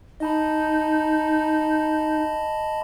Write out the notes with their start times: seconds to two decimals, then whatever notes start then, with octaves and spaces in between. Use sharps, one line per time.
0.20 D#4 D#5 A5 B5